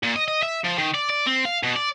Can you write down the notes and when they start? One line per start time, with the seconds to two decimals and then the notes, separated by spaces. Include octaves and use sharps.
0.03 A#2
0.16 D#5
0.28 D#5
0.43 E5
0.65 F3
0.78 D#3
0.94 D5
1.10 D5
1.27 C4
1.45 F5
1.63 B2
1.76 D5